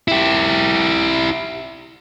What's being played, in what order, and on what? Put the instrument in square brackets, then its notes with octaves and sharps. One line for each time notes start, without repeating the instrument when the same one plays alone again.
[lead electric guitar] E4 G4